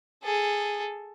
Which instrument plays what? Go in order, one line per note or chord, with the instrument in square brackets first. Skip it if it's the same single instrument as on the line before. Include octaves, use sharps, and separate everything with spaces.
[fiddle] G#4 A4